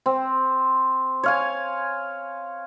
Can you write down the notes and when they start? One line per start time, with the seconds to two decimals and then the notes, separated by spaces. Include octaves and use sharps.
0.06 C4
1.23 C#5 F5 G#5